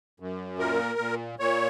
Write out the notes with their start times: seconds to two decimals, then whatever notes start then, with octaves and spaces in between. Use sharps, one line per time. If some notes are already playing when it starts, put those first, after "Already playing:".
0.20 F#2
0.59 A#2 A#4
0.99 A#2
1.39 A#2 C#5